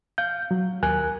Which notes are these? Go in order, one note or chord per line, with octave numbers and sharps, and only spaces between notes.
F5 G6
F#3
D#2 A#4 G#5 F#6